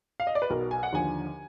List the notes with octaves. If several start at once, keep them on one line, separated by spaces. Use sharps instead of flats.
F5
D#5
D5
B4
B1 B2 A#4
G#5
F#5
D#2 D3 F3 G#5